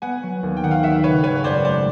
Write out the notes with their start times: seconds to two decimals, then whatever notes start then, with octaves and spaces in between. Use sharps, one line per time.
0.02 B3 F#5 G#5
0.23 F#3
0.43 D#2
0.57 G5
0.63 D#3 F#5
0.71 F5 G5
0.83 F#3 E5 F#5
1.04 C#3 B4 C#5
1.24 G#1 B4 C#5
1.44 F#2 C5 D5
1.65 A3 C5 D5